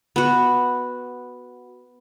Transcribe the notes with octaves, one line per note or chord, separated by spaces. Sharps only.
B3 F#4